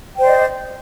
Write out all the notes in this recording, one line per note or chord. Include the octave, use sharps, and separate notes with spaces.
C5 D5 D#5 G5